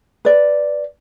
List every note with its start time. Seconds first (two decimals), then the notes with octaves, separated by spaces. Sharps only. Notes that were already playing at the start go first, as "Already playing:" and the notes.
0.25 B4 D5